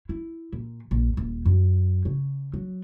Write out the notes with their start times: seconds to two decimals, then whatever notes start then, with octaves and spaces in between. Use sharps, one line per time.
0.09 E4
0.53 A#2
0.91 A#1
1.17 D#1
1.46 F#2
2.05 C#3
2.54 F#3